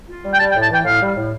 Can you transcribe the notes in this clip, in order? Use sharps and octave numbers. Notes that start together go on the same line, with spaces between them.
F4
G3
G5
G3 A5
G5
A2
A5
E3 G5
A2 F5
G3
A2